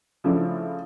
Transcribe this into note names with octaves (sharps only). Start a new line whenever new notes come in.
C#3 F3 A3 D4 E4